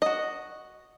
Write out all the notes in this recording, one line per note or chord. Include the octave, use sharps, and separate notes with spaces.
F#4 D#5